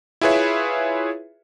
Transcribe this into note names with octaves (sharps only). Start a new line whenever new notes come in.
E4 F4 G#4 B4 C#5 E5